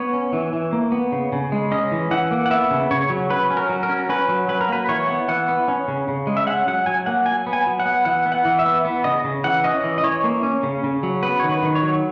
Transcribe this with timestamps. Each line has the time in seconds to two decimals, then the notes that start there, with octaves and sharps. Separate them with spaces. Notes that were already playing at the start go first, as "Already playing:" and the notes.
Already playing: B3 C#5
0.13 C#4
0.33 E3
0.53 E3
0.73 A#3
0.92 B3
1.12 C#3
1.32 C#3
1.52 G#3
1.72 C#4 D#5
1.92 E3
2.11 E3 F#5
2.31 A#3
2.46 F#5
2.51 B3 E5
2.71 C#3
2.91 C#3 C#5
3.10 F#3
3.30 F#3 B4
3.51 C#4
3.57 A#4
3.69 F#3
3.83 A#4
3.89 C#4
4.09 C#4 B4
4.29 F#3
4.48 F#3 B4
4.61 A#4
4.69 A#3 B4
4.89 E3 C#5
5.08 B3
5.28 E3 F#5
5.48 B3
5.68 C#4
5.88 C#3
6.08 C#3
6.27 G#3
6.37 E5
6.47 C#4 F#5
6.67 F#3 F#5
6.86 F#3 G#5
7.06 A#3 F#5
7.26 F#3 G#5
7.47 B3
7.53 G#5
7.67 F#3
7.80 F#5
7.86 B3
8.05 E3 F#5
8.26 B3
8.32 F#5
8.45 E3
8.59 E5
8.66 B3
8.85 B3
9.04 C#3 D#5
9.24 C#3
9.44 E3 F#5
9.64 C#4 D#5
9.84 E3
9.98 D#5
10.04 E3 C#5
10.24 A#3
10.43 C#4
10.63 C#3
10.84 C#3
11.03 F#3
11.23 B3 B4
11.40 D#3 C#5
11.49 B4
11.63 D#3
11.75 C#5
11.83 F#3